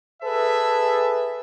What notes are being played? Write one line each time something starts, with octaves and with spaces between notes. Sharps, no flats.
G#4 A4 B4 E5